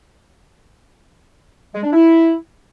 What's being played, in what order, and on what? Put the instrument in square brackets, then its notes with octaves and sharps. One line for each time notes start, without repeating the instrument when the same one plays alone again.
[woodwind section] G#3
D4
E4